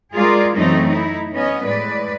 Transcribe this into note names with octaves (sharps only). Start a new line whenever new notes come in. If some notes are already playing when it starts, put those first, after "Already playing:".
G#3 F4 G#4 A#4 D5
F#2 E3 F#3 A3 C4 D#4
D#4 E4
B3 C#4 D#5
A2 G#3 B4 D5